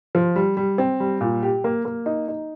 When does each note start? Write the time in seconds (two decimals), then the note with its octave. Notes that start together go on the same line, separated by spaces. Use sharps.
0.15 F3
0.36 G3
0.57 G3
0.78 C4
1.00 G3
1.21 A#2
1.43 G4
1.64 A#3
1.85 A#3
2.06 D#4
2.28 D#4